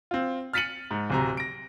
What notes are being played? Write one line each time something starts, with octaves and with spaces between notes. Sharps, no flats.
C4 F4
F6 A6 B6 C#7 D#7 F#7
G#2
D1 C3 A#5
A#6 D7